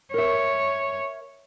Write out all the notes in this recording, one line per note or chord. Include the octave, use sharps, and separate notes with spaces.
A#4 C#5 E5